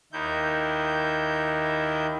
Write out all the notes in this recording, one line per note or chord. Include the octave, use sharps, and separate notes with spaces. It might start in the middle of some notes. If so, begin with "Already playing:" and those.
D#2 D#3 E4 G6